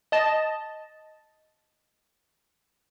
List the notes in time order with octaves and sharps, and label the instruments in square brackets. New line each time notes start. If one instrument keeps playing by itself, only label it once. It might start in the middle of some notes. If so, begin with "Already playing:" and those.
[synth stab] D#5 A5